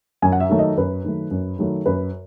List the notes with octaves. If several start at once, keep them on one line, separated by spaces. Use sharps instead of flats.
F#2 G#5
F#5
E5
D#3 F#3 A3
D#5
F#2 B4
D#3 F#3 A3
F#2
D#3 F#3 A3
F#2 B4